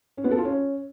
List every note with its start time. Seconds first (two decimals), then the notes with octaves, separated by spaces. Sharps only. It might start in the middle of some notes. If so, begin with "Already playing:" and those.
0.17 C#4
0.24 B3
0.31 A4
0.38 F4
0.45 C#4